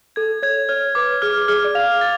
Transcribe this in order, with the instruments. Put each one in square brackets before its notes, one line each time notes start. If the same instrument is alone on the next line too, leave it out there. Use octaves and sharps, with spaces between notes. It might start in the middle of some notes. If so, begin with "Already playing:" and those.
[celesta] A4 [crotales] G#6
[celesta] C#5 [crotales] G#6
[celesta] C#5 [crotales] F6
[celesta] B4 [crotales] D6
[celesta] G#4 [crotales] F6
[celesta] G#4 [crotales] F6
[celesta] D5
[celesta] F5 [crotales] F7
[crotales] A6